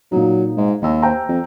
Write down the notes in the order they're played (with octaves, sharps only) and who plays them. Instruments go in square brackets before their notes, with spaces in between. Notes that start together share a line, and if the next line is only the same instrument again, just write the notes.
[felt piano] A#2 D#4 [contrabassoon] F#3
[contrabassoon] G#2
[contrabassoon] D#2 [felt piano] D#4 E6
[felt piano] C5 G5 A#5
[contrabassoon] F2